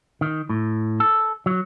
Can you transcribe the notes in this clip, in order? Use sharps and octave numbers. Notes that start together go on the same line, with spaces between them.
D#3
A2
A4
F#3